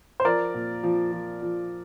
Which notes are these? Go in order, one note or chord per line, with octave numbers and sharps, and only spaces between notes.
C5
F3 A#4 D5
A#2
F3
F3
F3